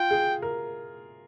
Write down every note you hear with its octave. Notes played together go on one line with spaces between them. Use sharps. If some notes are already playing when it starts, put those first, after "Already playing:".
Already playing: F4 G5
G#4
A#4